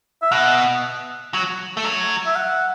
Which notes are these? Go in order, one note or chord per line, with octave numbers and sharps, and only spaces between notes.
E5
B2 F#5
F#3
A3
F#3
E5
F#5